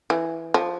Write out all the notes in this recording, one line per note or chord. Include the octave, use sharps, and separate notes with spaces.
E3
F3